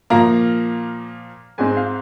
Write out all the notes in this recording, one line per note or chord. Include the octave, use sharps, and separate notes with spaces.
A#2 F3 A#3 F5 A#5
G#2 G#3 C4 G#5
F5